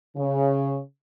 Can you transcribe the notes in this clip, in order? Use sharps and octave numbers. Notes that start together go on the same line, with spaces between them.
C#3